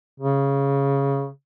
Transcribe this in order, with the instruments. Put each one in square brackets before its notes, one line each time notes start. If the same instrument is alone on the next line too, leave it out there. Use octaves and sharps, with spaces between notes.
[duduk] C#3